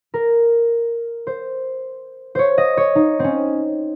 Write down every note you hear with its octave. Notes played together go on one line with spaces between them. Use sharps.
A#4
C5
C5 C#5
D#5
C#5
D#4
C4 C#4